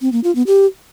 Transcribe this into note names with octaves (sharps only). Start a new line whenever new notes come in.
C4
A#3
F4
B3
G4